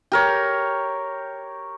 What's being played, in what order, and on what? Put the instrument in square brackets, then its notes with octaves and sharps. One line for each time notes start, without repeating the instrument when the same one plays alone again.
[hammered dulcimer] G4 A#4 C#5